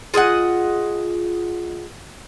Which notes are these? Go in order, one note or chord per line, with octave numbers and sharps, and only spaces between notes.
F4 G#4 D#5 F#5